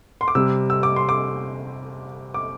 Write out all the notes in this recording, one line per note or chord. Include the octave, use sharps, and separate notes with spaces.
C6
D6
C3 G3 E6
E6
D6
C6
D6
D6